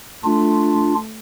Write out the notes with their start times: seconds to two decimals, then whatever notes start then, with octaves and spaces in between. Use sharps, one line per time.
0.24 A3 D4 F4